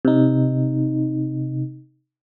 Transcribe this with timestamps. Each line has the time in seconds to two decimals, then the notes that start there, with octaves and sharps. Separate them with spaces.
0.05 C3 D#4